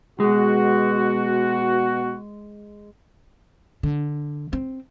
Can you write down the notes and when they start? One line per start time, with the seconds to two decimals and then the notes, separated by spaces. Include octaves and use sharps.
0.20 B2 G#3 F#4
3.83 D3
4.53 C4